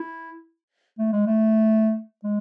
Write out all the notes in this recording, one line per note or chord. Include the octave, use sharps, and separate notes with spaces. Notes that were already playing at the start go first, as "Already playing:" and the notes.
Already playing: E4
A3
G#3
A3
G#3